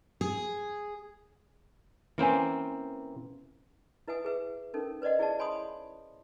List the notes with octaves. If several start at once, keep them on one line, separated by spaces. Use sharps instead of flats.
G#4
E3 A#3 C4 C#4 C5 G#5
E4 B4 E5 F#5 G#5 D#6
G#4 B4 E5
C#4 D#4 A4 A#4
B4 C5 D5 D#5 F#5
E4 G#4 D5 E5 F#5 A5
C#5 G#5 B5 C6 D#6